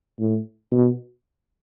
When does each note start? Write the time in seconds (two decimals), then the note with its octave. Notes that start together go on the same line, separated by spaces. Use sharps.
0.19 A2
0.72 B2